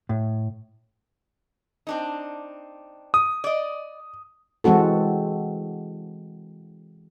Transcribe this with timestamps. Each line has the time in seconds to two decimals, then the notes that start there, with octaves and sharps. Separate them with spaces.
0.09 A2
1.87 C4 D4 D#4
3.14 D#6
3.44 D5 D#5
4.64 E3 G#3 C4 F#4 A4